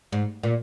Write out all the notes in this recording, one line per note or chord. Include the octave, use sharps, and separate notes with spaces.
G#2
A#2